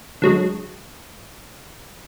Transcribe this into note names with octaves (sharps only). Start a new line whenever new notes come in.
D3 F#3 G#3